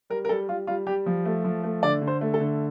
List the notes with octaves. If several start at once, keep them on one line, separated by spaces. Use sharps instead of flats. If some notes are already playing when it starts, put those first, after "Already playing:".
G3 A#4
A#4
G3 A4
G3 F4
G3 F4
G3 G4
F3
A3
F3
A3
D3 D5
D3
C5
A3
A4
D3